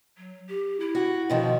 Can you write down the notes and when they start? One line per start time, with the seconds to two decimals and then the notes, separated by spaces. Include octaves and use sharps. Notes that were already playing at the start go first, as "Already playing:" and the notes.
0.18 F#3
0.49 G4
0.80 E4
0.95 F#4
1.30 B2 D#3 F3